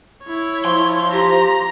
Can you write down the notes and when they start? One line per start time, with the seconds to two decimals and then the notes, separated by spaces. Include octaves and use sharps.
0.24 E4 C#5
0.65 F3 C6
1.12 G4 A#5